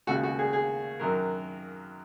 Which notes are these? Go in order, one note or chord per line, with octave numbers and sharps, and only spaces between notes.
D#2 C#3 G#3 F#4
F#4
G#4
G#4
F#2 D#3 F#3 A#4